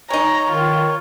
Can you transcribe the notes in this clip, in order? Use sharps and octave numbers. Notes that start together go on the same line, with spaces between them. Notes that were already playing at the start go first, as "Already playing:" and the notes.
G#3 D#4 C#5 A#5
D#3 F4